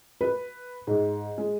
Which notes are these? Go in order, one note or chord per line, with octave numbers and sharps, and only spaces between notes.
B4
G#2
G#3